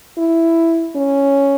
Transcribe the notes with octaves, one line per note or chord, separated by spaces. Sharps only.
E4
C#4